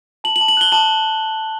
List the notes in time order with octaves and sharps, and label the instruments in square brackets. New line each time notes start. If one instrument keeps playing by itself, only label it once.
[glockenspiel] A5 F#7
F#7
A5
F#7
F#6 G7
A5 F#7